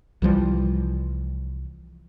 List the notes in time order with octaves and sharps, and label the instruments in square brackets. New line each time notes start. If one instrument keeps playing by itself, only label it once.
[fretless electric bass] C2 E3 F3 G3